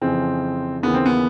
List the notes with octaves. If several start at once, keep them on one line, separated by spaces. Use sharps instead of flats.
F2 C#3 E3 C4
D#2 C#3 E3 B3
C4
B3